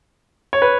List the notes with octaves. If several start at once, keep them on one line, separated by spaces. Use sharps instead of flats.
C#5
B4